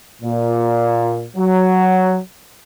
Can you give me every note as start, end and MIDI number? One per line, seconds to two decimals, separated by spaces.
0.22 1.25 46
1.36 2.19 54